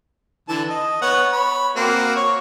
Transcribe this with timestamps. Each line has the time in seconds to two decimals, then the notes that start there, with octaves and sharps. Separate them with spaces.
0.49 D3 E3 A5
0.70 D#5
1.02 B3 C#5 F#5
1.33 C#5 B5
1.76 A#3 C4 F#4
2.16 C#5